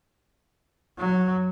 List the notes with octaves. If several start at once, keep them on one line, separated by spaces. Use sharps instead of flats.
F#3